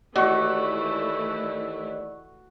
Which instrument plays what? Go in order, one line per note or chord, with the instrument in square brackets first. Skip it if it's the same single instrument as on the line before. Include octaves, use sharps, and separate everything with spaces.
[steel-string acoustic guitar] D#2 [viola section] E3 A3 E4 [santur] F#4 [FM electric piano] D5 C#6